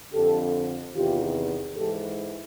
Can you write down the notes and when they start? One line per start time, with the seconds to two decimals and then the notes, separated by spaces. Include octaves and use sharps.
0.12 F2 D3 G4 A4
0.94 E2 C3 D#3 F4 G4
1.76 G#2 E3 G4 A4